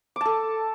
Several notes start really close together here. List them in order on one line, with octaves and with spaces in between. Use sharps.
D6 A5 A4